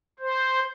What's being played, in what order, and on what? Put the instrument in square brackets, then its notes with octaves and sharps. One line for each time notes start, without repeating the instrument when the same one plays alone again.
[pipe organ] C5